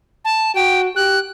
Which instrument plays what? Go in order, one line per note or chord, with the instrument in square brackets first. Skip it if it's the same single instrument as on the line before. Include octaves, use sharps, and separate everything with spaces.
[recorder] A5
[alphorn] F#4 [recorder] G5
[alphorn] G4 [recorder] F#6